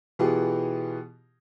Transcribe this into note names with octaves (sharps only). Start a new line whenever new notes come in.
B2 E3 B3 F4 G4 G#4